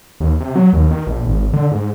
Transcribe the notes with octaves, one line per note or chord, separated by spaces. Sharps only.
D#2
C3
F#3
D#2
D#3
A#1
G#1
D3
G#2